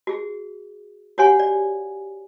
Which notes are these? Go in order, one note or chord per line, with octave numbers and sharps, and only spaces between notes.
F#4 G#4
F#4 G4 C#5 F#5 G#5 C6
D5